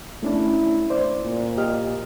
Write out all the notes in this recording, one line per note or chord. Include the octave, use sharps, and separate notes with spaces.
A3 C#4 D4 E4
C5 D5
A#2
G4 D#5 F6